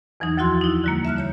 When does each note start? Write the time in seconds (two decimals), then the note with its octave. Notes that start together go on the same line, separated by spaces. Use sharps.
0.20 E2 E3 F#3 D#4
0.37 D2 F3 E4 F#4 C6 G#6
0.61 D#4 E4
0.84 D3 G3 A#3
1.05 E5 A5 F6 F#6
1.17 D3 C#5 G6